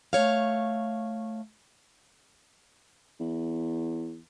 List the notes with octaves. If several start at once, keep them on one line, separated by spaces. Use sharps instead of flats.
A3 C#5 F5
E2